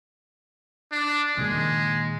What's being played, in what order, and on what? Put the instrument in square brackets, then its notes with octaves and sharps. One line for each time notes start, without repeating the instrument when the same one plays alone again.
[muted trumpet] D4
[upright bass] A#2 D#3 [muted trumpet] G#3